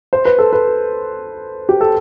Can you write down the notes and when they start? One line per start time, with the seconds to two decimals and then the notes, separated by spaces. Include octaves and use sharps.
0.13 C5
0.25 B4
0.39 A4
0.53 B4
1.69 G4
1.81 A4